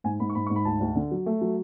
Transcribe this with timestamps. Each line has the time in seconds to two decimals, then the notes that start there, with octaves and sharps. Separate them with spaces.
0.04 G#2 G#5
0.20 G#2 B5
0.29 C#6
0.35 G#2 B5
0.46 G#2 C#6
0.56 B5
0.65 D2 A5
0.81 D2
0.95 D3
1.11 F#3
1.26 A3
1.41 F#3